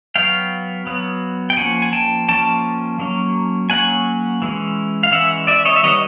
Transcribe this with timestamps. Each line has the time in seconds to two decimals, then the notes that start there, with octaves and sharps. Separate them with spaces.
0.15 F#3 B3 F5 G5
0.87 F#3 B3
1.50 G5
1.57 F3 A#3 C#4 F#5 G#5
1.82 G#5
1.93 G5 A5
2.28 F3 A#3 C#4 G5 A5
2.99 F#3 A#3 C#4
3.70 F#3 A#3 C#4 F#5 G#5
4.42 E3 G#3 C#4
5.03 F5
5.11 E3 G#3 C#4 E5 F#5
5.47 D5 E5
5.65 C#5 D#5
5.76 E5
5.83 D#3 G3 B3 C#5 D#5